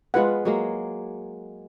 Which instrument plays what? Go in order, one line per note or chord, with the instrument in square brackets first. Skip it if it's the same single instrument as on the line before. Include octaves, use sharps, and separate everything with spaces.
[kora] G#3 B3 [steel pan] F4 B4 F#5
[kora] F#3 G#3 A#3